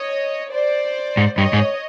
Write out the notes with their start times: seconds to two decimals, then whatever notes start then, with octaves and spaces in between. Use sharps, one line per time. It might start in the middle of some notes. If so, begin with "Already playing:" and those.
Already playing: C#5 D#5
0.51 C5 D5
1.17 G#2
1.38 G2 C#5 D#5
1.53 G#2